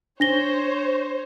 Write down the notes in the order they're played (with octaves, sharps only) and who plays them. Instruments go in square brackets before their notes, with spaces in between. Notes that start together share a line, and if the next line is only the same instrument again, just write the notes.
[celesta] D4 A#6 G7 [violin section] C5 C#5